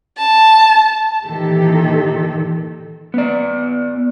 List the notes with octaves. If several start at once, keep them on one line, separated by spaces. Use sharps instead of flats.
A5
A#2 D#3 E3 G4 A4
B3 D5